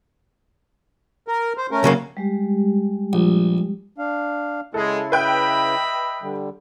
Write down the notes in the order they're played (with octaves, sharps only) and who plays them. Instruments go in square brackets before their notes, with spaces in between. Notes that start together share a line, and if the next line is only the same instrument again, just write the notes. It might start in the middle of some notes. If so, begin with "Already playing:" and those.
[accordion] A#4
C5
A3 C#4 A#4
[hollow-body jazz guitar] C#3 F#3 A#3
[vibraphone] G3 G#3 G4
[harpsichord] A#1
[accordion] D4 F5
[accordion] C#3 E4 [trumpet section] G#3 [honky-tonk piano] A4
[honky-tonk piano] B4 G5 F#6 [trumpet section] D#5 E5 B5
[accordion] D3 G3